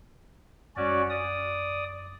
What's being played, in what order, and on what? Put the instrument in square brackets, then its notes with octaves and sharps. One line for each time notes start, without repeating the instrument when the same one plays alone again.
[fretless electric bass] F#2 G3 [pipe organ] C#4 F#4 D5
[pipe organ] D5 D#6